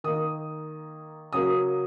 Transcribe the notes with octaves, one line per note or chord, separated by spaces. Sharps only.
D#3 A#3 D#6
C#3 F#3 A#3 D#6